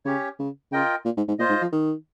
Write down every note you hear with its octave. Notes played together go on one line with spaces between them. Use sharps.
C#3 C#4 G4 C#5
C#3
C#3 F4 A#4 D#5 G5
A#2
G#2
G#2
A#2 F4 C5 D#5
G#2
F3
D#3